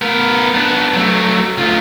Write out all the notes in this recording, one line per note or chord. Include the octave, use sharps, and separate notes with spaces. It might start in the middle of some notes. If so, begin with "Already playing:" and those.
B3 A#4
B3 D4
F#3 A3
D2 F4